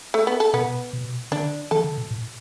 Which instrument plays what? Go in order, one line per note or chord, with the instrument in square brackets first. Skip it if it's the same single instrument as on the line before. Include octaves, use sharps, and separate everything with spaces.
[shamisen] A3
B3
A4
[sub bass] B2 [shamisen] B3
[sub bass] B2
[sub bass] D3 [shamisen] D4
[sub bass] E3 [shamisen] A4
[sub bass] D3
B2
A2